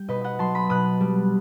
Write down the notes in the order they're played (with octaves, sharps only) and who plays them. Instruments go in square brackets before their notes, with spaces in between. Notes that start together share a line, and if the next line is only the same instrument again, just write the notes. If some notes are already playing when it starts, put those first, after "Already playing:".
Already playing: [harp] G3 G5
B2 B4 D#5
D#5 F#5
F#3 A5 C6
B5 D#6
B2 D#6 F#6
G3